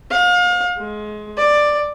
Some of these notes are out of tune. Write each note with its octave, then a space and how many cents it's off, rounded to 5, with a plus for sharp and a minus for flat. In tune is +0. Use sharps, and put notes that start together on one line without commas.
F5 +35
G#3 +25
D5 +10